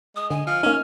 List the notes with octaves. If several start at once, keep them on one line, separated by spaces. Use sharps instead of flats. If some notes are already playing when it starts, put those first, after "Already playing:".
G#3 D#6
D3 G#5
F3 F6 C#7
A#3 C#4 D#4